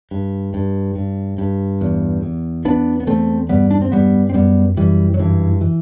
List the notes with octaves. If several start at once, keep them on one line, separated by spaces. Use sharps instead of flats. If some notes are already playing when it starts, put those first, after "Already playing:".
G2
G2
G2
G2
E2
E2
E2 B3 D4
B3
E2 A3 C4
G2 G3 B3
D4
C4
G2 G3 B3
C4
F#2 G3 B3
F#2 E3 G3
F#3
G2 E3
E3